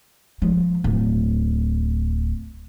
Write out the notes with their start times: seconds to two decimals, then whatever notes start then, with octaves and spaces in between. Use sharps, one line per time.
0.42 F3
0.84 D1